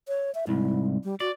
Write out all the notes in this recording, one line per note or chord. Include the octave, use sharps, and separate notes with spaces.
C#5
E5
C2 G#2 E4
G3
F#4 D5